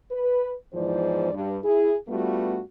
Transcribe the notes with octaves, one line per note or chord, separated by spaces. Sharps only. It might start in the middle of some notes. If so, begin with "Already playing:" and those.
B4
E2 G#2 E3 F3 C5 D5
G2
E4 G#4
G2 G3 A3 B3 F4 F#4